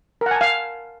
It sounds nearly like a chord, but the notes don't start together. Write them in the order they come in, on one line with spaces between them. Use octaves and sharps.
A#4 F#5 G#5 A5 F5